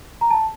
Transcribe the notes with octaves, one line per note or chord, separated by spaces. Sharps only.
A#5
A5